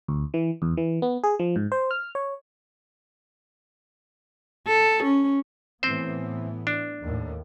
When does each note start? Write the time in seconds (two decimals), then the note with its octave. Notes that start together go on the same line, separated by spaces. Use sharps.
0.08 D2
0.34 E3
0.62 E2
0.77 E3
1.02 B3
1.24 G#4
1.39 F3
1.56 G#2
1.72 C5
1.91 F6
2.15 C#5
4.67 A4
5.04 C#4
5.83 A2 E3 B3 C4 C5
6.67 D4
7.01 D#2 A2